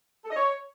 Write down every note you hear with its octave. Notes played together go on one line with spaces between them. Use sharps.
A4
D#5
C#5